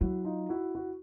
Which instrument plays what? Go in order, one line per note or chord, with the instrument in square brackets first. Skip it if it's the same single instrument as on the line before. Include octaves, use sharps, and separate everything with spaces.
[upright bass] F#3 [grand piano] E4 F#4
[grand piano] D#4 F4
E4 F#4
E4 F#4